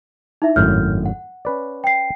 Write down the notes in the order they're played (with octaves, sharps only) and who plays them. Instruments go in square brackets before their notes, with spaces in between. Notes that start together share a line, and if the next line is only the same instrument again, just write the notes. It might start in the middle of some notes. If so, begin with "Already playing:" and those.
[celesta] D#4 E4 E5
[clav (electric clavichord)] G#1 F#2 A2 [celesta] F6 G6
[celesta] F#5
[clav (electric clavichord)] C#4 B4 D5
[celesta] G5 C7